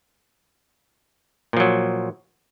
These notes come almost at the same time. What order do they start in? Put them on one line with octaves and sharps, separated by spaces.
A#2 F3 F#3